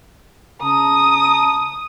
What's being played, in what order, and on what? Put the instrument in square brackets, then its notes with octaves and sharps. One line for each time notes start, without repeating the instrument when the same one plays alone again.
[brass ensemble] C#3 A5 A#5 [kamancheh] D#6